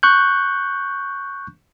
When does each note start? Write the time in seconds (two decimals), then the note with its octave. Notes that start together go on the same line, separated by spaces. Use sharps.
0.03 C#6 F#6 G6